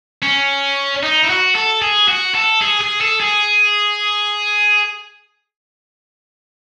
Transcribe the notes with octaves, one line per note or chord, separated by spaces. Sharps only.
C#4
D#4
E4
F#4
A4
G#4
F#4
A4
G#4
G#4
A4
G#4